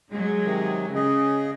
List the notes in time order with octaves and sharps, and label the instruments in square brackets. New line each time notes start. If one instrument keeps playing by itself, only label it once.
[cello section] F#3 G#3 G#4
[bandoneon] C3 D#3
[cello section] C#3 [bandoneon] G#4 D#5